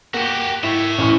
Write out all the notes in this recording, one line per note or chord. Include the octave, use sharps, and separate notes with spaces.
A#3 F#4 G4
E4 C#5 E5
A1 A2 C#6